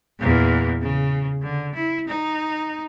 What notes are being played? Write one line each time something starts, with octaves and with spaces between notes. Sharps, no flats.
E2 A#2
C#3
D3
E4
D#4